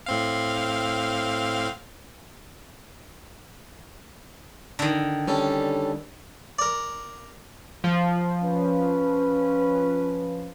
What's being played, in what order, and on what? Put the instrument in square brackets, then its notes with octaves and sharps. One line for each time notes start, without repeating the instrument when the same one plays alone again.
[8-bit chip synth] A2 C4 F5
[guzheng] D3 D#3
[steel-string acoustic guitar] G3 C#4 A4
[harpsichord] A#4 D5
[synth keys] F3
[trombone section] C#4 B4